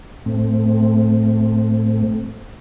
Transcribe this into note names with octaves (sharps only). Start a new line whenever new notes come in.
A2 A3 C4